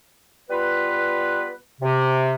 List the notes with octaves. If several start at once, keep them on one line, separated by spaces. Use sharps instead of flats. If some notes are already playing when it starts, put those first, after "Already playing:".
G3 B3 F4 B4
C3